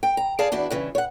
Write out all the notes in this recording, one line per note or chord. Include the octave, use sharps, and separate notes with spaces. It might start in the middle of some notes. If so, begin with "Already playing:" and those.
G5
A#5
G#4 D5 F5 A5
E2 D4 E4 F#4
G2 C#3 E3
C#5 F#5